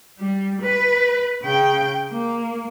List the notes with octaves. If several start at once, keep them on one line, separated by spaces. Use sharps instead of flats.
G3
B4
C#3 G5
A#3